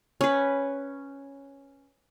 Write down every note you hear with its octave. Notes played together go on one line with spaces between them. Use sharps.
C#4 B4